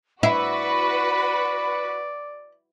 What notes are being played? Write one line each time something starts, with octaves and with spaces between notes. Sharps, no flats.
E4 F#4 B4 D5 F#5 B5